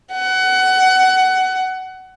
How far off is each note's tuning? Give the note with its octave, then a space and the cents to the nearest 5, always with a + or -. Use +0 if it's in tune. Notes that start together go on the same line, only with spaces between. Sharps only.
F#5 +20